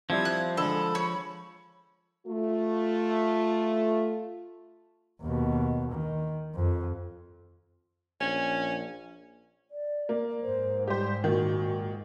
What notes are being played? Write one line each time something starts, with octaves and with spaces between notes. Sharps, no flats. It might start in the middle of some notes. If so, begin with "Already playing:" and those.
F3 G3 C4 E4 G#6
F#6
D3 G#3 A4 B5
C#5
A3 F4
D#2 B2
D#3
F2
A#1 C#4
D5
A#3
G#2 C5
G3 G4 C5
A#2 D#3 F#4